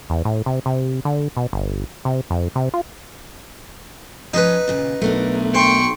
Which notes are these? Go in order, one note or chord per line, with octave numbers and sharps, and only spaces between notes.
E2
A2
C3
C3
D3
B2
G1
C3
F2
C3
F4
F3 B3 C#4 D#4 B4
D#2 A#2 C#3
B1 A3 B3 D4 A#4
C5 G5 C#6